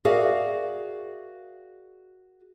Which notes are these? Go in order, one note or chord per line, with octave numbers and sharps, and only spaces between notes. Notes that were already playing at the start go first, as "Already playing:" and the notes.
F#4 G#4 A#4 D5 E5 F5